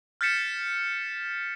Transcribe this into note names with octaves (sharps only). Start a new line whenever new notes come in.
F6 G6 A6 B6 C#7 E7